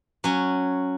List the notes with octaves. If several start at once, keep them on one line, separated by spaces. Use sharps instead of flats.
F#3 C#4